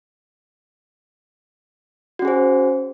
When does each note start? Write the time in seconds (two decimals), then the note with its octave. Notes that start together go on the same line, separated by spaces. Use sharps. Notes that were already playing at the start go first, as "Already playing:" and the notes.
2.19 F#4
2.22 C#4
2.25 G#4
2.28 C5